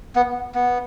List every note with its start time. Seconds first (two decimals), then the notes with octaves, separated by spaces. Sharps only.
0.16 B3
0.55 B3